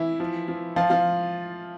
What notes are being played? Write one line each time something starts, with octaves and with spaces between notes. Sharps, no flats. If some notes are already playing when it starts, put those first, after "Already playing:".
Already playing: E3 E4
F3
F3
F3 F4
F3 F4